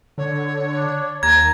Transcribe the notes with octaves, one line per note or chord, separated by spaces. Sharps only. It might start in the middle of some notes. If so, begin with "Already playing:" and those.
D3 C#5
D4
D#2 A#5 G#6